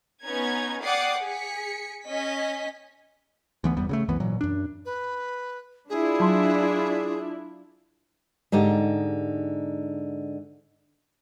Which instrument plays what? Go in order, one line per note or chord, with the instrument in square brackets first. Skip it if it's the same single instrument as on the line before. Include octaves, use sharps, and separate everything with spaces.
[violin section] B3 C#4 D#4 A#5 G#6
D5 F#5 G5 D6 D#6 C7
G#4 B6 C#7
C#4 D#5 B6
[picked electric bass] D2 E3 B3
G1 E2 G3 B3
C#3 F#3 A3
C2 F#2 E3 B3
G#1 A#2 E3 F#3
F#2 D4
[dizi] B4
[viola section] D4 E4 F4 [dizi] G#4
[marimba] F#3 A5 C6
[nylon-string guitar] G#2 D3 D#4 G4